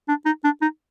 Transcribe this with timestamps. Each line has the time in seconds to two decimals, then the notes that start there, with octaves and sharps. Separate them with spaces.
0.09 D4
0.26 D#4
0.44 D4
0.62 D#4